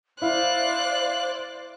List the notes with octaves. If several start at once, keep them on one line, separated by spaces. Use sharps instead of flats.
E4 C5 D5 F5 F#6